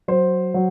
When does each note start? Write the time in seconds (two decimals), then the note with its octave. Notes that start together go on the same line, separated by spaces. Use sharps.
0.08 F#3 C5
0.54 F#3